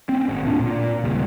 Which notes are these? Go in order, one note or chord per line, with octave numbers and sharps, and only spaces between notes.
C4 C#4
G#1
D1 A#2 D4
A#2
D#1 G#1 C#2